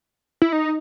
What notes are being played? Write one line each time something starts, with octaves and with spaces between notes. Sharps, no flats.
E4
D#4